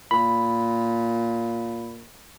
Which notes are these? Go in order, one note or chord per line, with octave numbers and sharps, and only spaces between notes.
A#2 B5